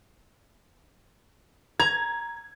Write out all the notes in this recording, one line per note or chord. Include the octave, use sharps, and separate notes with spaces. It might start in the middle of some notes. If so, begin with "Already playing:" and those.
A#5 G#6